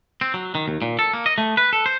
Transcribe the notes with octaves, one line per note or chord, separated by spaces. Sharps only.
C4
F#3
D#3
D#2
A#2
A4
A#3
D#5
A3
B4
A4
C5